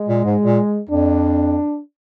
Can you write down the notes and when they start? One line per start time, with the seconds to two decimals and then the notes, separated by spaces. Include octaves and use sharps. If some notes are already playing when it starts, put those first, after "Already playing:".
Already playing: G#3
0.09 A#2
0.25 G#2
0.42 A#2
0.89 F2 D4